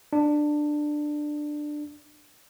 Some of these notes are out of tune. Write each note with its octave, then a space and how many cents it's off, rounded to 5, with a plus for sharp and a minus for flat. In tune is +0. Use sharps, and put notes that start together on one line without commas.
D4 +15